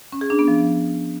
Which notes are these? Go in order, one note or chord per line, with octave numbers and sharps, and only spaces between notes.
C#4
G#4
D4
B3
F3